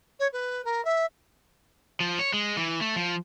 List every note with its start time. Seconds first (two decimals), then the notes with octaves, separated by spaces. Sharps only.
0.19 C#5
0.32 B4
0.65 A#4
0.85 E5
2.00 F3
2.19 C#5
2.34 G#3
2.57 E3
2.81 A3
2.96 F3